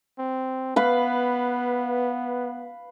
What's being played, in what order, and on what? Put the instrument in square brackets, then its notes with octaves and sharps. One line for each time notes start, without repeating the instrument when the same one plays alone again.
[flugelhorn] C4
[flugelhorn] B3 [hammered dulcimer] B4 F5